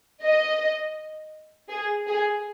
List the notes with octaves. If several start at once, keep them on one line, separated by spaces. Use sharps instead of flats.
D#5
G#4
G#4